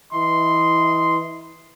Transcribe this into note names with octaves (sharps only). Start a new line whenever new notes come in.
E3 E4 D#5 C6